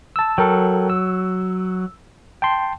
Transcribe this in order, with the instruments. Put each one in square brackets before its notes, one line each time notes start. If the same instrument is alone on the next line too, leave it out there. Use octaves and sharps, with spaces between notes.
[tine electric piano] A5 E6
[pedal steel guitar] F#3 [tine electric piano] A4 A#4 G5
[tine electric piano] E6
G5 A5 C6